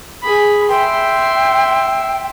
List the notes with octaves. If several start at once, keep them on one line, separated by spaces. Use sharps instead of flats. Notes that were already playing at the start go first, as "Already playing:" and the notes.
G#4 B5
E5 G5 C6